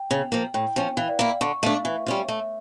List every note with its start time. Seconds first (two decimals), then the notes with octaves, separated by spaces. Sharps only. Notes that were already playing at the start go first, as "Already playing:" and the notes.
Already playing: G5
0.11 C#3
0.32 F3 A#3
0.54 A2 G5
0.76 F3 C#4
0.97 E3 F5
1.09 D5
1.19 A#3 E4 F5
1.41 D3 C#6
1.63 A3 D4 F5
1.84 E3 E5
2.06 G3 C#4 F4
2.28 A3 E5